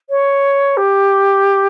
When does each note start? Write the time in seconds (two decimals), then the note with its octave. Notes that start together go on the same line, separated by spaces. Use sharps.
0.09 C#5
0.77 G4